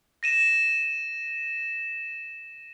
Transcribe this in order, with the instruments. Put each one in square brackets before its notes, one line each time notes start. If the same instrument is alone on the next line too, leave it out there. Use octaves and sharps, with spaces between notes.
[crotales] A#6 D#7 E7